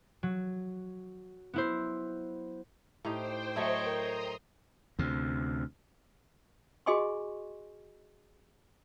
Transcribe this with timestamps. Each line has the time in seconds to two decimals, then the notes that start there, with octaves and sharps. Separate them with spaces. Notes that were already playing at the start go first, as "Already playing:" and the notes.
0.23 F#3
1.54 B3 E4 C5
3.05 A2 D#4 G4 C5 G5
3.56 F#3 A3 E4 C#5 D#5
3.87 A#4 A#5 C6 D#6
4.99 D2 C3
6.86 F#4 G#4 D#5 G#5 C6 C#6